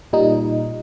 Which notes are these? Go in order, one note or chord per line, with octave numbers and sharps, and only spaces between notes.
A#2 G3 D#4